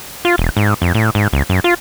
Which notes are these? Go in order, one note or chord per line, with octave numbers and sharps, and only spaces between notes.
F4
E1
G#2
F2
A2
G#2
C#2
F#2
F4